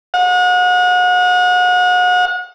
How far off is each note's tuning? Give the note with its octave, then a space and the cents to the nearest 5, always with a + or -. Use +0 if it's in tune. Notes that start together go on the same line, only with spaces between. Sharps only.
F#5 -35